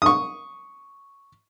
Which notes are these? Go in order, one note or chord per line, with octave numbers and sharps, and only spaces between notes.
C#6 D#6